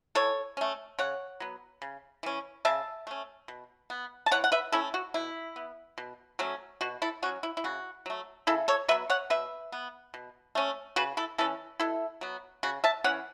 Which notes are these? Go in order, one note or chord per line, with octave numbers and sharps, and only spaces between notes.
E3 A4 C#5
A3 C#4
C#3 C#5 F#5
F#3 B3
C#3
E3 C#4
C#3 E5 A5
A3 C#4
B2
B3
A5
E3 C#5 F#5
F#5
B4 E5
A3 C#4 E4 A4
F#4
B2 E4
B3
B2
F#3 A3 C#4
B2 F#4
E4 A4
F#3 C#4 F#4
E4
E4
C#3 F#4
F#3 A3
C#3 E4 A4
A4 C#5
F#3 B3 B4 E5
C#5 F#5
B2 B4 E5
B3
B2
A3 C#4
C#3 F#4 B4
E4 A4
E3 C#4 E4 A4
B2 E4 A4
F#3 B3
C#3 F#4
E5 A5
E3 C#4 C#5 F#5